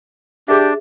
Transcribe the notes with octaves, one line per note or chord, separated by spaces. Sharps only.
D4 G4 G#4 E5